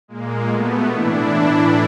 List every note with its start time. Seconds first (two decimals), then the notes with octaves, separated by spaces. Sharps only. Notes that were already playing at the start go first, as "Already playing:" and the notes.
0.08 A#2 G#3 A#3
0.47 B2 A3 B3
0.86 A2 E3 D4 E4
1.24 A2 E3